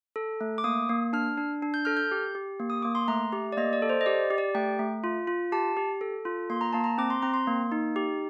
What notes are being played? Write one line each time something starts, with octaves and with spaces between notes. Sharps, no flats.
A4
A3
D6
A#3 D#6
A#3
D4 F6
D4
D4
G6
A4 F6
G6
G4
G4
A#3
D#6
A#3 D6
C6
A3 A#5
G4
D5
A#3 D#5
D5
A4
C5
D#5
G4 D5
G4
D5
A3 G5
A3
F4
F4
G4 A5
G4
A4
F4
A#3 C6
A#5
A#3 A5
A#5
C4 D6
C6
C4 A#5
C6
A#3
D#4
G4